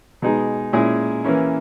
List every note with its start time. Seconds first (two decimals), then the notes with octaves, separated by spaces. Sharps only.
0.22 B2 G#3 D#4 G#4
0.73 A#2 G#3 C#4 E4 G#4
1.24 E3 A#3 C#4 E4